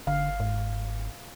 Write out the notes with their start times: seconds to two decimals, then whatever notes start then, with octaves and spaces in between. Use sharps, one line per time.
0.07 G1 D3 F5
0.40 G#2